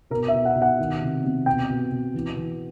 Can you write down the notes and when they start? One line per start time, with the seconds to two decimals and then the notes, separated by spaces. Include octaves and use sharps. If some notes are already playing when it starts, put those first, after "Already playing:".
0.10 B2 A#4
0.28 E5
0.33 B2
0.45 F#5
0.55 B2
0.62 F#5
0.79 D#3
1.02 C3
1.24 C3
1.46 B2 G5
1.70 B2
1.91 B2
2.14 E3
2.37 E3